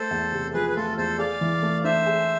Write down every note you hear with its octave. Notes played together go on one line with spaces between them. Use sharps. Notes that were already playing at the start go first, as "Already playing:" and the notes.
Already playing: A3 A4 C5
E2
C3
F3 G#4 B4
B4
A3 F4 A4
E2 A4 C5
G#4 D5 F5
E3
A3
D4 C5 E5
G#4